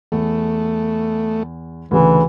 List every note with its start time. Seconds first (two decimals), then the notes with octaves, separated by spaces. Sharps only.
0.12 E2 A3
1.91 D2 C#3 E3